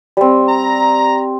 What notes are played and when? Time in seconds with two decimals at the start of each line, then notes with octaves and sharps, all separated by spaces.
0.17 G3 C4
0.49 A#5